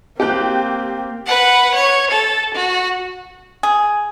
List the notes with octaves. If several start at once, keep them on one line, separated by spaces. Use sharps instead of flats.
A#3 C4 G4 G5 F#6
B4 F#5
C#5
A4
F#4
G#4